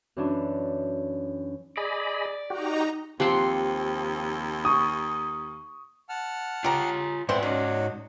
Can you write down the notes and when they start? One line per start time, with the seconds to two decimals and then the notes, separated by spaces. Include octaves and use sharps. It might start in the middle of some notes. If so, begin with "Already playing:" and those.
0.17 F#2 E3 C#4 D4
1.77 G#4 D5 D#5 B5
2.50 D#4 F#4 G4 A#5
3.20 D#2 F3 C4 G4 F#5 C6
4.65 C#6 D#6
6.09 F#5 A5 F6
6.64 F4 G4 C#5 A#5
7.29 G#2 E3 C4 C5 D5 F#5
7.43 C#4 D#4 F#4 C#5